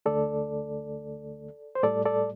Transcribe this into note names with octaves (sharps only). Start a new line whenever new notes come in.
D2 D3 A3 A4 D5
C5
A2 G3 A4 D5
A4 D5